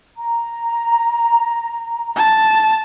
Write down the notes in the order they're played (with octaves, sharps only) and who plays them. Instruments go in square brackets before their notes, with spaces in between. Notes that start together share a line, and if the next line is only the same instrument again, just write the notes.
[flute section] A#5
[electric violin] A5